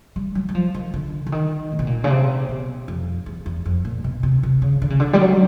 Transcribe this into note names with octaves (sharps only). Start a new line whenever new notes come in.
G3
F#3
F#3
F3
D#3
D3
D3
D#3
A#2
B2
A#2
C#3
C3
B2
F2
E2
E2
F2
A#2
B2
C3
C3
C#3
D3
C#3
D3
G3
F#3